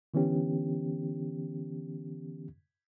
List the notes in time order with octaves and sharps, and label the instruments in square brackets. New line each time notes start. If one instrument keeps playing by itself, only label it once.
[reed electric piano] D3 E3 B3 C#4 G4